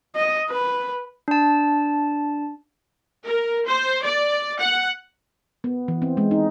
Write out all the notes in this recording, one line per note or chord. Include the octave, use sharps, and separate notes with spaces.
D#5
B4
D4 A5
A#4
C5
D5
F#5
B3
E3
C4
G#3
D#4